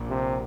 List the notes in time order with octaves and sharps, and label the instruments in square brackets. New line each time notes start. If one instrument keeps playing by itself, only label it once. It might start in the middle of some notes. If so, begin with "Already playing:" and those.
Already playing: [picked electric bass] A#1 A#2
[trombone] C3